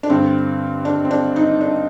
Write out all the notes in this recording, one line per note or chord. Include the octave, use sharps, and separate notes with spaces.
D4
G2 D3 C4
D4
C4
D4
D#4
D4